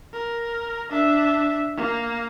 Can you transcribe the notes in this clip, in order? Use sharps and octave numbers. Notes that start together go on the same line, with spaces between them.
A#4
D4 E5
A#3